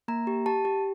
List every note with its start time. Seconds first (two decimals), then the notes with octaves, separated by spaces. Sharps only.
0.08 A#3 A#5
0.27 G4
0.46 G4 A5
0.65 G4